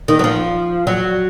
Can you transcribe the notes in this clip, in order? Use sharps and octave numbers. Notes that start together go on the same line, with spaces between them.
D#3
F#3
F3
F#3